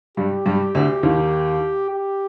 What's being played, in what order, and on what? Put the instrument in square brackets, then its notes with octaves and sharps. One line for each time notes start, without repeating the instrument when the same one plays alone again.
[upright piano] G2 G3 [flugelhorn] G4
[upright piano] G2 G3
D2 D3
D#2 D#3
[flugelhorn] G4